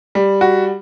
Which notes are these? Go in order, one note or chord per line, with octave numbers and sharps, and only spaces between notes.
G3
F#4